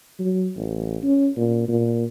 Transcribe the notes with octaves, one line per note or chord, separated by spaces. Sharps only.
F#3
A1
C#4
A#2
A#2